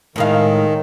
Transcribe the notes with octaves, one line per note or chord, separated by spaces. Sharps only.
A2 D#3 G#3 F5